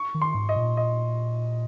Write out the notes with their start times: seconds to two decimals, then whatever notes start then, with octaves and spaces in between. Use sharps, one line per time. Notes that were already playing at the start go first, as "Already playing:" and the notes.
Already playing: C#6
0.14 D#3
0.22 C6
0.34 G#2
0.49 D#5
0.56 A#2
0.77 D#5